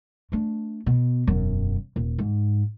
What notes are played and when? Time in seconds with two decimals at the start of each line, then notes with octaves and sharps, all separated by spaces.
0.32 A3 D4
0.86 B2
1.27 E1 F#2
1.96 D#1
2.18 G#2